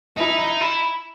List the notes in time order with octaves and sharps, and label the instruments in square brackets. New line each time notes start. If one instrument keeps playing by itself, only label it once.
[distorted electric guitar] D#4 [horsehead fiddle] E4
[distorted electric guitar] D#4
E4